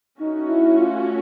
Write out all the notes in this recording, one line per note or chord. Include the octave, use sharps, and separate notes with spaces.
A3 C#4 D#4 F#4
E4
F4